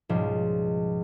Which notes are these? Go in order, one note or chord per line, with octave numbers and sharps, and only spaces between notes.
C#2 G#2 B2 F3 G3